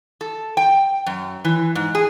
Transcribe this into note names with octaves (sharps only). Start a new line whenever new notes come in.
A4
G5
F#2
E3
G#2
G#4